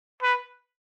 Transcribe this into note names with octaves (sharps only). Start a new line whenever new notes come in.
B4